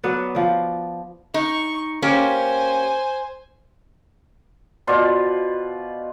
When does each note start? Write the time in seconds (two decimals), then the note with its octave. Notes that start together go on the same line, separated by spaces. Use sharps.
0.03 F#3 B3 B4 D5
0.35 F3 D5
1.34 D#4 C#6
2.02 A#3 C#4 G4 C5 G#5
4.87 B2 F4 C5 D5